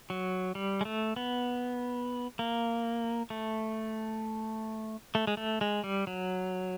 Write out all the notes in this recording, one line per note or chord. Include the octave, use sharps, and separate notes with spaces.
F#3
G3
G#3
A3
B3
A#3
A3
A3
G#3
A3
G#3
G3
F#3